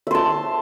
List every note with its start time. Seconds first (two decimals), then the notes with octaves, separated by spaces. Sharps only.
0.07 E5
0.11 C6
0.15 A5